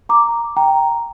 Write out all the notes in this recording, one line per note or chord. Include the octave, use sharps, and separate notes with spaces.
A#5 D6
G5 A#5